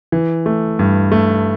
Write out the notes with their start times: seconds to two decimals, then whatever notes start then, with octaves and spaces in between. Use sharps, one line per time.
0.12 E3
0.46 A3
0.79 G2
1.12 A3